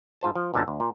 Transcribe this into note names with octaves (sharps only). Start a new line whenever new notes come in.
G#2 F4 C5 A5
F3
B1 F#2 A#2 D3 A5
D2
A#2